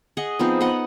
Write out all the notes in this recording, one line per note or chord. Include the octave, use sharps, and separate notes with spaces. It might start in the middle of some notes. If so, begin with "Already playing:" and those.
G#4 D#5 F#5
F3 B3 C4 D#4
B3 D#5 F#5